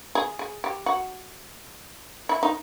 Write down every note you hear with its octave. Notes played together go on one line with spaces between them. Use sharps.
G#4
G#4
G4
F#4
E4
D#4